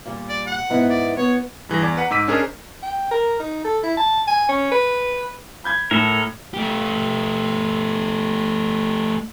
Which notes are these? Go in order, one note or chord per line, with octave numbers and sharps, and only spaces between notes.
A#2 G3
D5
F#5
G#2 B3 E4
D5
B3 C#5
G2 E3 G#4 A#6
E2 D5 D6
B4 F#5 A#5
G#2 D#4 D6 E6 B6 D#7
C#4 D4 G#4 A#4 C5 D#5
G5
A#4
D#4
A4
E4
A5
G#5
C#4
B4
B5 G6 G#6
A2 A4 A#4
A3 G4